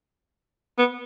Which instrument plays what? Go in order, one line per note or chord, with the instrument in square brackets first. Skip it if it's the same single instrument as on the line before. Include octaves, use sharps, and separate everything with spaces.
[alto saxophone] B3